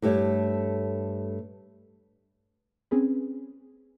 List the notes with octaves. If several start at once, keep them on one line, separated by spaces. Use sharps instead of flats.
G2 A3 G4 C#5
C4 C#4 G#4 B4